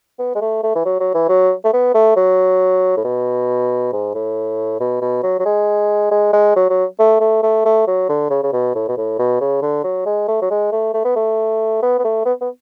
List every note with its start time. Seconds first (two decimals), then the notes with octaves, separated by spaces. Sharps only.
0.19 B3
0.35 G#3
0.41 A3
0.63 A3
0.75 E3
0.85 F#3
1.00 F#3
1.14 E3
1.29 F#3
1.64 A3
1.73 B3
1.94 A3
2.16 F#3
2.97 A2
3.04 B2
3.93 G#2
4.14 A2
4.80 B2
5.01 B2
5.23 F#3
5.39 F#3
5.46 G#3
6.11 G#3
6.33 G#3
6.56 F#3
6.70 F#3
6.99 A3
7.21 A3
7.43 A3
7.65 A3
7.87 F#3
8.09 D3
8.30 C#3
8.43 C#3
8.53 B2
8.75 A2
8.88 B2
8.97 A2
9.19 B2
9.41 C#3
9.62 D3
9.84 F#3
10.06 G#3
10.28 A3
10.42 F#3
10.50 G#3
10.72 A3
10.94 A3
11.05 B3
11.16 A3
11.83 B3
11.99 B3
12.05 A3
12.25 B3
12.41 B3